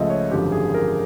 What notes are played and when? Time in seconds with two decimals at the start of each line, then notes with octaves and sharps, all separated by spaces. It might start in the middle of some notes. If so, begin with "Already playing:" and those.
Already playing: C#2 C#3 F3 A3 D#5 E5
0.10 C#5
0.31 G#1 F#2 D3 F3 G4
0.52 G#4
0.74 A#4